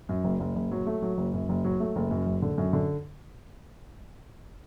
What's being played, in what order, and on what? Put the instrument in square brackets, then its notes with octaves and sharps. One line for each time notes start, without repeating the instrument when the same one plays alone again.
[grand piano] F#2
F#1
F#1
F#1
F#3
A3
F#3
F#1
F#2
F#1
F#3
A3
F#1
F#2
F#1
D3
F#2
D3